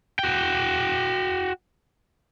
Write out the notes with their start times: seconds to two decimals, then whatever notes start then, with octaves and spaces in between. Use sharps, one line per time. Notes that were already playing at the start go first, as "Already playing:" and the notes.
0.19 F#4 G5